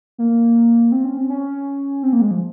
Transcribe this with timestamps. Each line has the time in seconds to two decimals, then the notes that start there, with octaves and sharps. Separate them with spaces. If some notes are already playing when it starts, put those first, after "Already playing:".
0.18 A#3
0.92 C4
1.05 C#4
1.18 C4
1.30 C#4
2.03 C4
2.13 A#3
2.21 G#3
2.31 F3